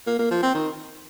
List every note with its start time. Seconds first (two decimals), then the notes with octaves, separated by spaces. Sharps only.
0.07 A#3
0.19 A#3
0.31 F3
0.43 C4
0.55 D#3